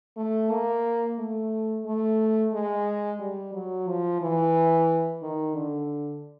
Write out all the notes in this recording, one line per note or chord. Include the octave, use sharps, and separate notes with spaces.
A3
A#3
A3
A3
G#3
G3
F#3
F3
E3
D#3
D3